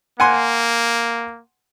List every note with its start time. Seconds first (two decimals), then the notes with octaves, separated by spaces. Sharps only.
0.20 A#3 F#5 G#5 C6